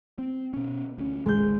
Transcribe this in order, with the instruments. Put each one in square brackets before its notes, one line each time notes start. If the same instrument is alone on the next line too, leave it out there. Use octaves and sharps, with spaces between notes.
[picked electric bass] C4
B2 C#4
D2 C#4
[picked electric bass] G#1 C#2 G#2 [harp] G#3 G6